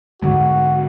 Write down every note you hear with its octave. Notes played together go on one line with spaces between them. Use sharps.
G#2 D3 G#3 F#4